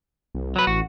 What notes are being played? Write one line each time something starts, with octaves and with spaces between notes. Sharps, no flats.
C2
F#3 B4
A1 F#4